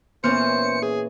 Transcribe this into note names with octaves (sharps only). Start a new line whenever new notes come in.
A#2 E3 B3 C#4 C5 F6 C#7
G#4